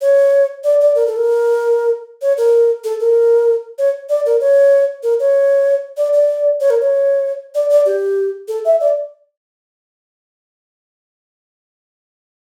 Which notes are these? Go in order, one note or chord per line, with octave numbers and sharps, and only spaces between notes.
C#5
D5
D5
A#4
A4
A#4
C#5
A#4
A4
A#4
C#5
D5
A#4
C#5
A#4
C#5
D5
D5
C#5
A#4
C#5
D5
D5
G4
A4
E5
D5